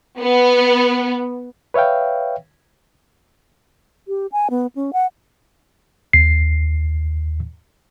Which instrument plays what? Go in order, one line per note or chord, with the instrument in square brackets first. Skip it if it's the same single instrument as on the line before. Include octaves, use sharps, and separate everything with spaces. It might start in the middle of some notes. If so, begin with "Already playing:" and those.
[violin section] B3
[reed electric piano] B4 C#5 E5 F5 G5
[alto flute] G4
G#5
B3
C#4
F#5
[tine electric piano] D#2 C7